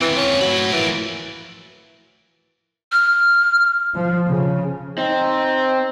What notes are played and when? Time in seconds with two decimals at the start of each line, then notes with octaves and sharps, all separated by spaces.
0.01 E3 A#3 C4
0.16 C#4
0.41 F#3 A3 B5
0.73 E3 F3 A#4
2.92 F6
3.95 F3
4.28 C#3
4.98 C4 D#4